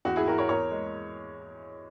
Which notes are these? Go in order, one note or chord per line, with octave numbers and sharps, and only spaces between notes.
E2 F#4
E4 G#4
E3 F#4 A#4
A#4 C#5
E2 A#4 C#5
G#3